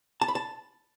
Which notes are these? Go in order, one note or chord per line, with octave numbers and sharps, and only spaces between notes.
A5
B5
A5